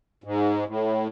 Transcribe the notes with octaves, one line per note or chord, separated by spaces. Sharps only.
G#2
A2